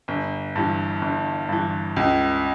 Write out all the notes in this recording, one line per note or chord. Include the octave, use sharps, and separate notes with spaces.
G1
G2 E3
G1
G2 E3
C#2